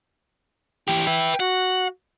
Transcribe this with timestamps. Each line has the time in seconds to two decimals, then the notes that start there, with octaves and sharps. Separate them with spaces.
0.88 E3 G4 G5
1.07 B4 E5
1.40 F#4 F#5